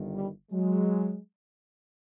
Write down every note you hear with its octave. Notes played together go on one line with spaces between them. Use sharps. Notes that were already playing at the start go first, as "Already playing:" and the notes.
Already playing: G1 G2 D#3
G3
F#3 G#3